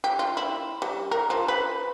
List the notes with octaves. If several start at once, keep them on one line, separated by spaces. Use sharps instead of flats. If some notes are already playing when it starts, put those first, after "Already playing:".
G4
F4
E4
G3
A#4
F3
B4